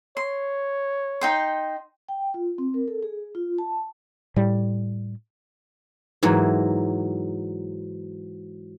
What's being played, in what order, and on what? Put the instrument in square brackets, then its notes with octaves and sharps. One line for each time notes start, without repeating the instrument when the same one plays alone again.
[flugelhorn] C#5 [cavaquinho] C6
[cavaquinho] D#4 G5 C6
[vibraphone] G5
F4
C4
A#4
A4
G#4
F4
A5
[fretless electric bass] A2 G3
[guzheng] G#2 E3 F#3